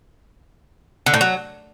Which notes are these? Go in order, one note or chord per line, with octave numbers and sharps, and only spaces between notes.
D3
A2
F#3